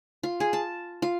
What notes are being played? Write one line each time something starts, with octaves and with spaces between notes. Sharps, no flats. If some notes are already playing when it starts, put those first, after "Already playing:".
F4
G#4
A5
F4